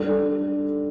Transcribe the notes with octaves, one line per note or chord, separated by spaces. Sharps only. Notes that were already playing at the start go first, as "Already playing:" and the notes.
Already playing: G3 D4 A4